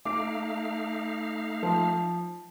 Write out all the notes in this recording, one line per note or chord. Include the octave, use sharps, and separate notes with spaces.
A3 D#4 F5 D6
F3